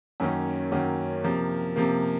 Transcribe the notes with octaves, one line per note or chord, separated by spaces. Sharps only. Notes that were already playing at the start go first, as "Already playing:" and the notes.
F#2 D#3 F#3 A#3 C#4
F#2 D#3 F#3 A#3 C#4
C3 F3 A#3
C3 F3 A#3